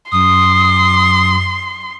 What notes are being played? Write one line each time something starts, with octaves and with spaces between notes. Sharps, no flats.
F#2 C6 D#6